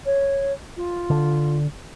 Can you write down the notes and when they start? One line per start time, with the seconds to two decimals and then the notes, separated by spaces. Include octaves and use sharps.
0.05 C#5
0.76 F4
1.10 D3